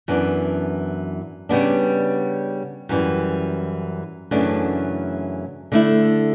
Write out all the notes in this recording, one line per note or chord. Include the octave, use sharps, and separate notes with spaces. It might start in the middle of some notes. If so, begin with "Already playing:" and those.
F#2 E3 B3 D4
C#3 G3 B3 D4
F#2 E3 G3
F#2 C#3 E3 A3 D4
D3 A3 E4